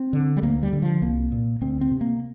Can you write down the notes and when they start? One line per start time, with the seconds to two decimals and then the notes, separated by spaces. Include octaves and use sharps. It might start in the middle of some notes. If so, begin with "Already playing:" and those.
Already playing: C4
0.13 D3
0.37 G3
0.43 D2 A#3
0.63 G3
0.73 D3
0.82 F3
1.02 C2 A#3
1.32 A#2
1.61 D2 C4
1.81 C4
1.91 C3
2.01 A#3